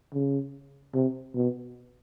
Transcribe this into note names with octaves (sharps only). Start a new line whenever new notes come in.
C#3
C3
B2